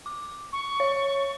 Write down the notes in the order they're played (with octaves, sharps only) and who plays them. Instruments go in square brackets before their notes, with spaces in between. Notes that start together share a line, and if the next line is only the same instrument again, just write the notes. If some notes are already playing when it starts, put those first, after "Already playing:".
[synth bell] D6
[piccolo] C#6
[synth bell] C#5